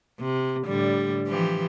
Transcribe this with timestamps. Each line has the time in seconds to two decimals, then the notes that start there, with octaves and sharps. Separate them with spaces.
0.20 C3
0.66 A2 D3 G3
1.28 E3 F3 G4